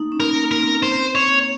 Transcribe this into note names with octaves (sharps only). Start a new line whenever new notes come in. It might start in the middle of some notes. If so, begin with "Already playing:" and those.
Already playing: A3 A#3 D#4
C#4
A#4
A#3
A#4
C4
C4 C5
C#5
A#3